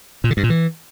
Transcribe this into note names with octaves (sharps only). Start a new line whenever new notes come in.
A#2
D3
G2
A#2
E3